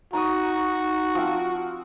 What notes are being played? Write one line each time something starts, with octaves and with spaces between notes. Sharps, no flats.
D#4 F#4 A#5 C#6 D#6
F3 C4 F5